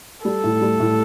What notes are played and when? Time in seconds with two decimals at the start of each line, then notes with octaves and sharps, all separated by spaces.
0.25 G3 A4
0.44 A2
0.62 G3
0.80 A2